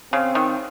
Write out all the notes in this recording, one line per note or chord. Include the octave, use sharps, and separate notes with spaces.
C#3 C4
D#3